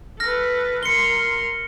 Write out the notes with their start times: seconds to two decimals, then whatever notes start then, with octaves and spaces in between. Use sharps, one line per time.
0.20 A4 B4 F6 A#6
0.83 A#4 C6 C#7 G7